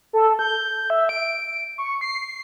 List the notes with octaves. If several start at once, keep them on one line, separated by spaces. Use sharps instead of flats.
A4
G6
E5
D7
C#6
C7